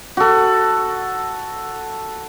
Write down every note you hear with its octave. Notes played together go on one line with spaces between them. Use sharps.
F#4 A4